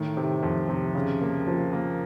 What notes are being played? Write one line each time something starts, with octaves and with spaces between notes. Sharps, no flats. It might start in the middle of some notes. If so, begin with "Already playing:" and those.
Already playing: A2 D#3
C3
F2
C3
C#3
A#3
F3
A#3